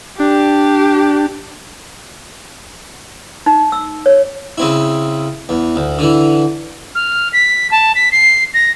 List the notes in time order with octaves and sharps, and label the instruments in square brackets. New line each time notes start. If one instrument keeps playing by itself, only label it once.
[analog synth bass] D4 [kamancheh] G4
[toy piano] D#4
E6
C#5
[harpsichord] C#3 C4 E4
E2
D2
D3 E3
[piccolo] F6
B6
A5
B6
C7
A#6